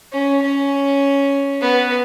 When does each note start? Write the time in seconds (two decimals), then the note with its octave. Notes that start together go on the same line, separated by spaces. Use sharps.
0.12 C#4
0.42 C#4
1.61 B3